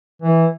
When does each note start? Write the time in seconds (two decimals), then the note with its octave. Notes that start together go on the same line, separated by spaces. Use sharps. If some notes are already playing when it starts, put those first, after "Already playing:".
0.22 E3